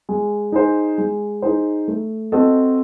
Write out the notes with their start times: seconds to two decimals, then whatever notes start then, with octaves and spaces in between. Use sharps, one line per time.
0.09 G#3
0.52 D#4 G#4 C5
0.98 G#3
1.42 D#4 G#4 C5
1.88 A3
2.32 C4 F#4 A4 D#5